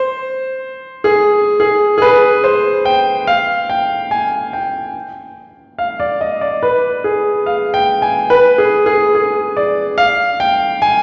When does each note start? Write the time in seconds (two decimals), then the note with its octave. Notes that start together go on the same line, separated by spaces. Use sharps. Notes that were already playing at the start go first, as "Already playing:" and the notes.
Already playing: C5
1.04 G#4
1.60 G#4
1.98 G#4
2.02 B4
2.44 C5
2.85 G5
3.27 F5
3.70 G5
4.11 G#5
4.53 G5
5.78 F5
6.00 D5
6.21 D#5
6.41 D5
6.63 B4
7.04 G#4
7.46 F5
7.74 G5
8.02 G#5
8.30 B4
8.58 G#4
8.86 G#4
9.15 G#4
9.57 D5
9.98 F5
10.40 G5
10.82 G#5